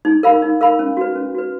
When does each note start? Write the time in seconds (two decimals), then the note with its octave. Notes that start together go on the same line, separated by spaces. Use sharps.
0.05 D#4
0.23 A#4 F5 B5
0.42 D#4
0.61 A#4 F5 B5
0.79 C#4
0.97 F#4 B4
1.16 C#4
1.35 F#4 B4